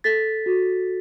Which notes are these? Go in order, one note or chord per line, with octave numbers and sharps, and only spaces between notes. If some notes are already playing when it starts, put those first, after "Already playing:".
A4 A6 B6
F#4